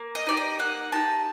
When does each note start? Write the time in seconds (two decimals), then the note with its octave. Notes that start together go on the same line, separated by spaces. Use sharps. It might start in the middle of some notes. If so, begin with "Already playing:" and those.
Already playing: A#3
0.15 D#5
0.26 D#4 G4 D5
0.37 D#5
0.59 A#3 F#5
0.92 D#4 G4 A5